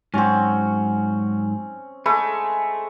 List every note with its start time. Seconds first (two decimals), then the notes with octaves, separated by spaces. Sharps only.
0.14 G#2 F#3 C4 C#4 F#4
2.06 G#3 A3 A4 B4 E5